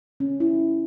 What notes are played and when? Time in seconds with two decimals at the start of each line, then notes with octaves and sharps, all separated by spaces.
0.20 C#4
0.40 E4